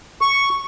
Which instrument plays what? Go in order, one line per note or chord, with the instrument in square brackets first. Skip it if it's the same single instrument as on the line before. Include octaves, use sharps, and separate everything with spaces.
[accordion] C#6